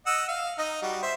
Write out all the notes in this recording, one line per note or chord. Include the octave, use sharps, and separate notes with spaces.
D#5 F#5 E6
F5
D#4 D#5
G3 F#4
C5 E5